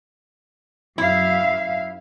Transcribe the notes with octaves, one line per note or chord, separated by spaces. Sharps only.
F#2 E4 E5 F5